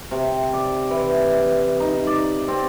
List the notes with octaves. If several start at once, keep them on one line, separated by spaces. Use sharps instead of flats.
C3
D5
E3
D#4
D5
C4